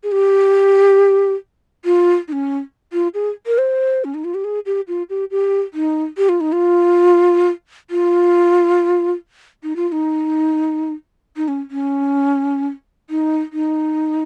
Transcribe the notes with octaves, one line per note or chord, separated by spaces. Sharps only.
G#4
G4
F4
D#4
C#4
F4
G#4
A#4
C5
C#4
D#4
F4
G4
G#4
G4
F4
G4
G4
D#4
G4
F4
D#4
F4
F4
D#4
F4
F4
D#4
D#4
C#4
C#4
D#4
D#4